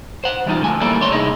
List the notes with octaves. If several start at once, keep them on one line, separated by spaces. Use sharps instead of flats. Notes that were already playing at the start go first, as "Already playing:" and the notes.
C5 F#5
E3 G3 A#3 D#4 F4
D3 F3 A3 G#5
G3 A#3 E4 A4 D5
D#2 D4 C#5 C6
C2 D#4 E4 G#4 D#5